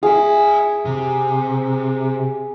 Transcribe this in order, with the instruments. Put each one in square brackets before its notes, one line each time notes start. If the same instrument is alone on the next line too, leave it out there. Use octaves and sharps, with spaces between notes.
[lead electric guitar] F4 E5 [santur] G#4
[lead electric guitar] C3